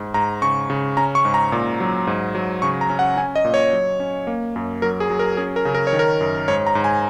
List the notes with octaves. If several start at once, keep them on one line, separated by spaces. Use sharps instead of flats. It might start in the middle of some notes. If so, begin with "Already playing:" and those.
Already playing: G#2
G#2 A#5
C#3 C#6
C#3
C#4 A#5
C#6
G#2
A#5
A#2
F#3
G#2
F#3
C#3 C#6
A#5
C#4
F#5
C#4 G#5
D#5
A#2
C#5
F#3
C#4
A#3
F#2
F#3 A#4
G#4
F#3
A#4
C#4 G#4
A#4
C#3
A#4
C#5
D#3
A#4
F#2
G#2 C#5
A#5
G#2
G#5